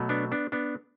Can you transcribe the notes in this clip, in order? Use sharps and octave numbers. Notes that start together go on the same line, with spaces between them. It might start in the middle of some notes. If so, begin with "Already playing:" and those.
Already playing: B2 F#3 A3
B3 D4
B3 D4
B3 D4